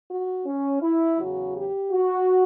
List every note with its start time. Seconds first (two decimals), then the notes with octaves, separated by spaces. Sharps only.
0.09 F#4
0.46 C#4
0.82 E4
1.19 E2 C#3 F#3 F#4
1.55 G4
1.92 F#4